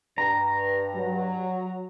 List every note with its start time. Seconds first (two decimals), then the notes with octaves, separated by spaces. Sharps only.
0.18 G2 A#5
0.95 F#3